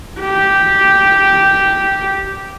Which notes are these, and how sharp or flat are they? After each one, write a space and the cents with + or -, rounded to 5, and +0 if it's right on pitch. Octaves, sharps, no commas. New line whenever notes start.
G4 -5